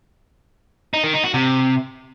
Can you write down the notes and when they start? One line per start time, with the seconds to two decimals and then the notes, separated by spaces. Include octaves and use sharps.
0.94 D#4
1.04 D#3
1.14 D#4
1.24 F#4
1.34 C3